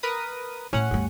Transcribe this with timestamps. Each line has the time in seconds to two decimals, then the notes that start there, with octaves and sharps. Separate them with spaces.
0.03 A#4 B4 D#6
0.73 A2 A3 C#4 F#5
0.91 D2 G2